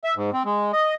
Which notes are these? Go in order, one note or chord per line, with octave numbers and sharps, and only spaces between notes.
E5
G#2
C4
G#3
D#5